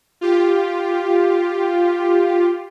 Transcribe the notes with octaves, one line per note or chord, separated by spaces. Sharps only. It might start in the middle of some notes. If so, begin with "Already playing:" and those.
F4 G4